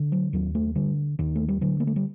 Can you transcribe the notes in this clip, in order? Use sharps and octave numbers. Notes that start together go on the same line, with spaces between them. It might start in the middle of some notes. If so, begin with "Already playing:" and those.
Already playing: D3
F#3
D#2 F#3
A3
D3 G3
D#2 D#3
A3
G3
D3 F#3
A#3
A3
G3